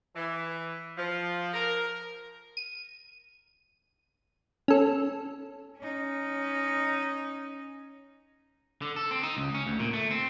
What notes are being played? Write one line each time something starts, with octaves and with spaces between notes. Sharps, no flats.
E3
F3
A#4
D#7
C#4 A4
C#4 D#4
D3
A4
C4
D#4
C#2
C#4
D2
A#2
A3
C4